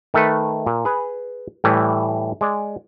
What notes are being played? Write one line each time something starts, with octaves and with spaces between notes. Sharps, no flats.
D#3 A3 A4 B4
A#2
G#4 B4
A2 E3 G3
G#3 D5